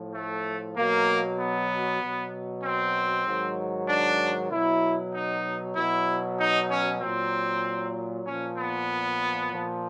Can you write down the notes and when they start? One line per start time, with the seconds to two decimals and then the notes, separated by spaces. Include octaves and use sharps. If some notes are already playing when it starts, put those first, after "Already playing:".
Already playing: A2 F3
0.14 A3
0.76 B2 F#3 A#3
1.39 B3
2.01 B2 F#3
2.64 C4
3.26 G#2 D#3 F#3
3.89 D4
4.51 B2 F#3 E4
5.14 D#4
5.76 B2 F#3 E4
6.39 D#4
6.70 C#4
7.01 A#2 F#3 C4
8.26 A#2 F3 C#4
8.58 B3
9.51 A#2 F3